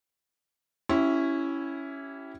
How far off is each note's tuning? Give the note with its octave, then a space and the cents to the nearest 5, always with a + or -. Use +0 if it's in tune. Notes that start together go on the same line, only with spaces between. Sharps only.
C#4 +0 E4 +0 G4 -30